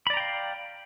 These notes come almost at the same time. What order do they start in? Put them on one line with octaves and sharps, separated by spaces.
B5 D5 A#5 G5 F5